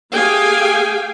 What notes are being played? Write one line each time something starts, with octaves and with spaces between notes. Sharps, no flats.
A3 G4 G#4 F5 G5 G#5